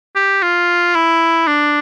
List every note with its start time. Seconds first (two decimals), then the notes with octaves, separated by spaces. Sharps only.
0.16 G4
0.43 F4
0.95 E4
1.47 D4